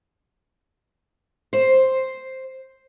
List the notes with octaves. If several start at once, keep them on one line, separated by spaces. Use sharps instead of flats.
C5